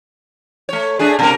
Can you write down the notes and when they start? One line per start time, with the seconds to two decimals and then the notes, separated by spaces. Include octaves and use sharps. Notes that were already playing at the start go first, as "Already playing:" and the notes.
0.69 A3 C#5
0.99 A3 D4 G#4
1.19 B2 G3 A#4